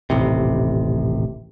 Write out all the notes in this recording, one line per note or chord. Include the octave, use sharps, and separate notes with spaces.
D#1 A1 C3